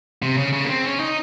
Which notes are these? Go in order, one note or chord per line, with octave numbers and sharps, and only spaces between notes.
C3
C#3
C#3
A#3
C4
C#4
D#4